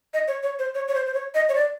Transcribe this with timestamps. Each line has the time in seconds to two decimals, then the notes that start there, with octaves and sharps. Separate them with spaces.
0.14 D#5
0.28 C#5
0.43 C#5
0.59 C5
0.75 C#5
0.88 C#5
0.95 C5
1.06 C5
1.14 C#5
1.35 D#5
1.49 C#5
1.55 D5